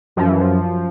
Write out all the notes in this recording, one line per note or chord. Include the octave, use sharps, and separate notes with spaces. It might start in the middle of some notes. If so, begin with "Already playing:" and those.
F#2 F3
E3
F3